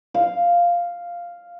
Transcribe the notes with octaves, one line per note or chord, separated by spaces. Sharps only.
F5